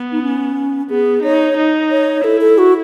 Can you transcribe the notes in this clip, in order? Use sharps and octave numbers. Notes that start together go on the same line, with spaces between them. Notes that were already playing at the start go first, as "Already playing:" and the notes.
Already playing: B3
D#4
C#4
B3 G#4
D#4 C#5
D#4
C#5
E4 A4
A4
F#4